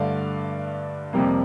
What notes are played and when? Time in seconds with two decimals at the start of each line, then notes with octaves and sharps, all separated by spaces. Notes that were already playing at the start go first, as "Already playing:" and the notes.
Already playing: G2 D3 A3 D5 F5
1.13 F2 C3 G3 A#3